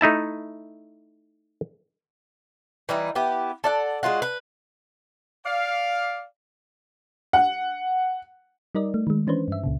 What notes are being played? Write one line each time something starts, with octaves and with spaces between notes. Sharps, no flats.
A3 D#4 E4 A5
E3 G3 D#4
B3 E4 G4
A4 D5 F#5
G#3 A#3 F4 F#4
B4
D5 F5
F#5
G3 D#4 A#4 D5 D#5
A3
D#3 G#3
E3 C#4 D4 B4 C5
G2 E5
C#2 A#2 C#3